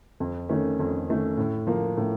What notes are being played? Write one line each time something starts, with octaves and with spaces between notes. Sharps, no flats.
F2
D#3 A3 C#4
F2
D#3 A3 C#4
A2
F3 A#3
A2